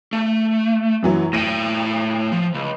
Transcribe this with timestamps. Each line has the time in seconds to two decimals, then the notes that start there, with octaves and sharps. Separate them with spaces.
0.13 A3
1.03 F#2 E3 F#3
1.33 A2 G5 A#6 D#7
2.32 F3
2.54 C#2